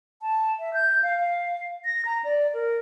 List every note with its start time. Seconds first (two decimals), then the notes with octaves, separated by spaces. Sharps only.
0.22 A5
0.59 E5
0.74 G6
1.03 F5
1.20 F5
1.85 A#6
2.05 A#5
2.24 D5
2.54 A#4